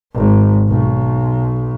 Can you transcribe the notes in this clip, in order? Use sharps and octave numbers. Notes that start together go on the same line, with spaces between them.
G#1
B1